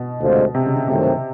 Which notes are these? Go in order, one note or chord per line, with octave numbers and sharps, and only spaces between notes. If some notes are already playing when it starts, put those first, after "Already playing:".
Already playing: B2
D2 C3 F3 G#3
C3
C#3
C#3
G2 C3 D#3 F#3 A3 C4